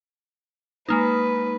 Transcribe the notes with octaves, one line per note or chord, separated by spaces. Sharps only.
G#3 A#3 D#4 B4